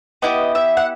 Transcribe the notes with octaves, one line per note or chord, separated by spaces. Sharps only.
B3 E4 G4 D#5
E5
F#5